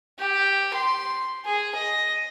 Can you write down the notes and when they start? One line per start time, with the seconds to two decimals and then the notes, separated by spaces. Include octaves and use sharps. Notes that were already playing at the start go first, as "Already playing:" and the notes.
0.19 G4
0.74 C6
1.46 G#4
1.75 D#5